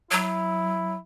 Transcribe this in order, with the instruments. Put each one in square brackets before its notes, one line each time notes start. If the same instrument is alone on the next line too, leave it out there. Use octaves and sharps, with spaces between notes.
[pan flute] F#3 [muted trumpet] E4